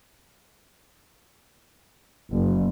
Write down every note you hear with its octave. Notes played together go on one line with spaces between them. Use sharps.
F#1